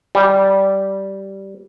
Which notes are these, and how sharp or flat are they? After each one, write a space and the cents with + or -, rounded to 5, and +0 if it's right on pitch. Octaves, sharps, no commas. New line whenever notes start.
G3 -10